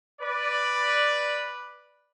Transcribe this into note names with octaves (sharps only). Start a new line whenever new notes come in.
B4 D5